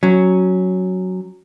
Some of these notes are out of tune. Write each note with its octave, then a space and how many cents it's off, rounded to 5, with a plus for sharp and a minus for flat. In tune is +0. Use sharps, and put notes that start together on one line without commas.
F#3 +0 C#4 +0